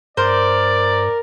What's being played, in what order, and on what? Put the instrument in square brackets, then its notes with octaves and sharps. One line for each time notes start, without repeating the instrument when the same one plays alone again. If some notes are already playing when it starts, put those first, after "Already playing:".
[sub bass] G2 [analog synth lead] A#4 [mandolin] C5 [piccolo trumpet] D5